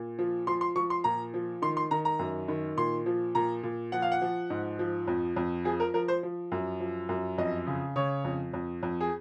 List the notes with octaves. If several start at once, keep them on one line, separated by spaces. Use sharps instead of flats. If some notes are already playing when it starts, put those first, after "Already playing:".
Already playing: A#2
F3
F3 C6
C6
F3 C#6
C6
A#2 A#5
F3
D#3 C6
C6
D#3 A#5
A#5
F#2
D#3
A#2 C6
F3
A#2 A#5
A#2
F3 F#5
F5
F#5
F3
G#2
F3
F2
F2
F3 G#4
A#4
F3 A#4
C5
F3
F#2
F3
F#2
F2 D#5
C#3
C#3 C#5
F2
F2
F2
G#4